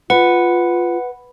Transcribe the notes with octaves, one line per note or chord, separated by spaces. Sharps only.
F4 B4 F#5